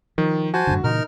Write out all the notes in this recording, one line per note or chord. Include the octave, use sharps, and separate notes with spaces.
D#3 F3
F#4 C5 G#5 A5
F#2 A2 D3
A#2 C#3 E3 D#4 A#4 F6